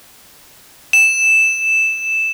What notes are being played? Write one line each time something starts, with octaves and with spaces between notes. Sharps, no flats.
E7